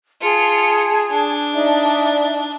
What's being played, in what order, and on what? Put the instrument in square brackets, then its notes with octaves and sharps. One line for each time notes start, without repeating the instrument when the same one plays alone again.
[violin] F4 C#7 [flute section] G#4 A5
[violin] D4
[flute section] D#4 D5 E5